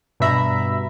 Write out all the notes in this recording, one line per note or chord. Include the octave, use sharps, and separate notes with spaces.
G2 B2 E5 A#5 B5